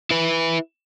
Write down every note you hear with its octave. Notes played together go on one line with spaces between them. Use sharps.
E4 B4